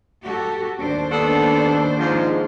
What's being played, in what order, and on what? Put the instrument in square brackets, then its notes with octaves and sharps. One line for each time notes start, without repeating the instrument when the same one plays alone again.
[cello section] F#4 G4 A4
D#2 D4 C5
[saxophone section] B3 F#4 A4
G#2 F3